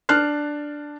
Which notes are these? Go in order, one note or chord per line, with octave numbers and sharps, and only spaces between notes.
D4 A5 F6 F#6 C7